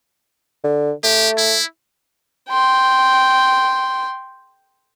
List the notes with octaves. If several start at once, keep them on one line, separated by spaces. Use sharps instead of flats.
D3
A3 G4
E4
G5 C6